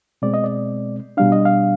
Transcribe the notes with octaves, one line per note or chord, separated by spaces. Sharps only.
B2 G#3 C4 D5
D#5
D5
B2 G3 D4 F5
D#5
F5